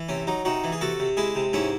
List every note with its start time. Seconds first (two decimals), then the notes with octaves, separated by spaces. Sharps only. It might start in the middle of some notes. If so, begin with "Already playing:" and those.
Already playing: E3
0.09 C3 C#4
0.27 F#3 D#4
0.45 C3 D#4 F#4
0.64 E3
0.72 G#4
0.81 C3 F#4 A4
0.99 C3
1.17 G#3 E4 G#4
1.35 C3
1.53 G#2 C#4 E4